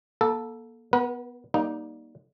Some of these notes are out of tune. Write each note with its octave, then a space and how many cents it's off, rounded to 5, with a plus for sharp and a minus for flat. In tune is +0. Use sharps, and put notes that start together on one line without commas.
A#3 +30 A4 +0
B3 +0 B4 -45
G3 -5 A#3 +25 D#4 +0